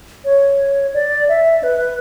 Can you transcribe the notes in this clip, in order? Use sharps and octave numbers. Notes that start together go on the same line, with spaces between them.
C#5
D5
E5
B4